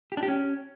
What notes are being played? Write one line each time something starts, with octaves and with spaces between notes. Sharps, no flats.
G4
D4
G4
C#4